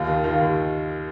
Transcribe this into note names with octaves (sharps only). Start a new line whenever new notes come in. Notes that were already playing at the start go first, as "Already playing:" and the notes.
Already playing: D#2 F4
D#3
D#3 F4
D#2